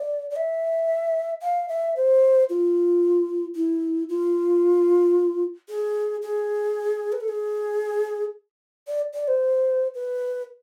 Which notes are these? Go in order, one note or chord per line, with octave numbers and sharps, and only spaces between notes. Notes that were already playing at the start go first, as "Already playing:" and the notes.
Already playing: D5
D5
E5
F5
E5
C5
F4
E4
F4
G#4
G#4
B4
A4
G#4
D5
D5
C5
B4